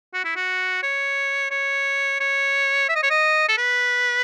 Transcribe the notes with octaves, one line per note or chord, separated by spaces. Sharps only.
F#4
E4
F#4
C#5
C#5
C#5
E5
D#5
C#5
D#5
A4
B4